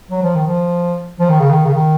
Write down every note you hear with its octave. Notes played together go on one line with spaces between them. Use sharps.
F#3
F3
D#3
F3
F3
D#3
C#3
D#3
C#3
D#3